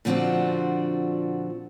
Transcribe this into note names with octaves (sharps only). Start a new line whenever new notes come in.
A#2 D3 F3 C4 D4 F#4